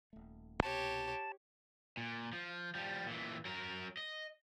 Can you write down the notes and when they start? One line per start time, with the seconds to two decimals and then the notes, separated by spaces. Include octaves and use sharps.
0.13 D#1 A3
0.63 C2 B2 G4 C#5 A5
1.97 A#2
2.33 F3
2.75 F3 G3
3.06 A#2 E3
3.45 F#3 A#4
3.97 D#5